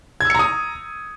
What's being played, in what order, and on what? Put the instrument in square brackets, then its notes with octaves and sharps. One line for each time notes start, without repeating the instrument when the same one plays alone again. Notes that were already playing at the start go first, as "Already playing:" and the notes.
[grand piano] G#6
E6
C#7
A#5
D#6